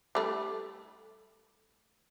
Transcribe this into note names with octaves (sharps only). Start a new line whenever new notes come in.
G3 A3 E4